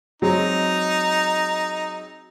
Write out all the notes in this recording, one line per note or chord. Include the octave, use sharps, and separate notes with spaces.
F#3 G#3 C4 D#4